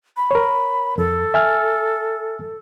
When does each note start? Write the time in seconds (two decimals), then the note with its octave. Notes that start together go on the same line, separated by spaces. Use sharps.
0.17 B5
0.31 A#4 C#5
0.98 F2 A4
1.34 E5 G#5 F6